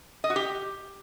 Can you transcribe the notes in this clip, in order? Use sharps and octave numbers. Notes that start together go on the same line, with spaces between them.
D#5
F#4
G4